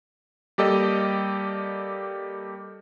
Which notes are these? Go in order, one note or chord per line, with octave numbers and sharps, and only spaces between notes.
G3 A#3 G4 A4 D5 D#5